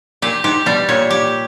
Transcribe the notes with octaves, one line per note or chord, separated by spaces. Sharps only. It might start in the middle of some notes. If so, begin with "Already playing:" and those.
A#2 G4
G#2 G4
B2 G3
A#2 C#5
G4